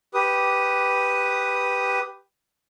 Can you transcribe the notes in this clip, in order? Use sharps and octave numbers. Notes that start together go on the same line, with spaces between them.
G4 B4 D#6